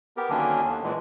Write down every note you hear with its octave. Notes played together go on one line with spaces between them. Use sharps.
B3 G4 A#4
D3 D#3 F#3 A#3 C#4 D4
D#2
A#2 E3 G#3